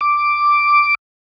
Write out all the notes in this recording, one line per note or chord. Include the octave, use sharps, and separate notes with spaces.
D6